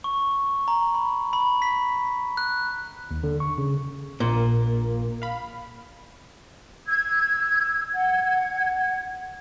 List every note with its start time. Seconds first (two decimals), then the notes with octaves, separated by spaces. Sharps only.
0.04 C#6
0.68 A#5
0.94 B5
1.33 B5
1.62 B6
2.37 F#6
3.11 D#2
3.24 D3
3.40 C#6
3.58 C#3
4.20 A#1 A#2 A#3
5.22 F5 B5
6.86 E6 G#6
7.94 F#5 G#6